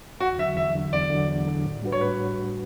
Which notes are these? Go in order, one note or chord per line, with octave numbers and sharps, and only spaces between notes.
E2 F#4
D3 F#3 E5
E2 E5
D3 F#3
E2 D5
D3 F#3
E2
D3 F#3
A2
G3 D4 F#4 B4
C#5
A2 B4